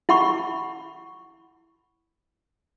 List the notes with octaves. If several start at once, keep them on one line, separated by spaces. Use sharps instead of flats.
E4 F#5 B5 C#6